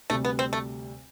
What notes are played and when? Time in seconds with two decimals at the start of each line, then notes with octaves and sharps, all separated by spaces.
0.10 D2 C3 G3 A3
0.25 B3
0.39 C4
0.53 A3